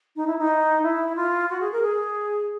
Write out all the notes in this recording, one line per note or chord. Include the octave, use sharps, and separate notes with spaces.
D#4
E4
D#4
E4
F4
F#4
G#4
A#4
G#4